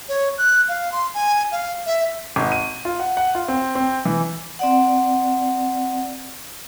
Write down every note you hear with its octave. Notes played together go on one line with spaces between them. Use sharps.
C#5
F#6
F5
C6
G#5
F5
E5
G#1
D#7
F4
F#5
F#5
F4
C4
C4
E3
C4 D5 F#5